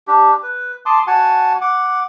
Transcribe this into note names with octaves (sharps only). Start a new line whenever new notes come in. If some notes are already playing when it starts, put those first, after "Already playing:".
D4 G4
B4
A5 C6 D6 D#6
F#4 F#5 G#5 A5
F#5 D6